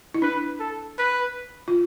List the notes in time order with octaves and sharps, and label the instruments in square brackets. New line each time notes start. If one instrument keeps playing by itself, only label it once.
[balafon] E4
[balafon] D4 [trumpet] B4
[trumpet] A4
B4
[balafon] F4